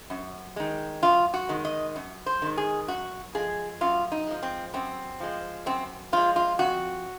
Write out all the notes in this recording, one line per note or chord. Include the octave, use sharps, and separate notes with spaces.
F#2
D#3 G#3
F#2 F4
F#4
D#3 G#3
D#5
F#2
C5
D#3 G#3
G#4
F#2 F#4
F3 G#3 G#4
F#2 F4
D#4
F3 G#3
C4
F#2 C4
F3 G#3
F#2 C4
F3 G#3 F4
F4
F2 F#4